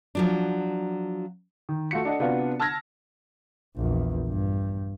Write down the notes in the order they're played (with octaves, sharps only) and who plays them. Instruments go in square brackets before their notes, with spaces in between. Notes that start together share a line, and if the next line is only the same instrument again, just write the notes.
[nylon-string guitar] F3 F#3 D4
[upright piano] D#3
A3 F4 F#4 C#7
D4 A4 D#5 F#5
C3 B3 D4 F4 F#4
A5 E6 F6 G#6 A#6
[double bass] A#1 E2
G2